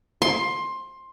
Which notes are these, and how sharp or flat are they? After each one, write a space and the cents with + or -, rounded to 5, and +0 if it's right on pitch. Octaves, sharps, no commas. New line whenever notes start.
C6 +15